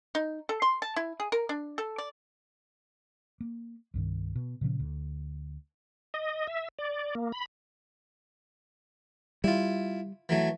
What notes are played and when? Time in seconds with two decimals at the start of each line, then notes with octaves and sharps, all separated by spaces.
0.15 D#4
0.49 A4
0.62 C6
0.82 A5
0.96 E4
1.20 G#4
1.32 A#4
1.49 D4
1.78 A4
1.98 D5
3.40 A#3
3.94 C2 G2 D#3
4.35 B2
4.61 A#2 C#3 F3 C#4
4.79 D2
6.14 D#5
6.48 E5
6.79 D5
7.15 A#3
7.32 B5
9.44 G3 E4 F4
10.29 E3 F#3 A3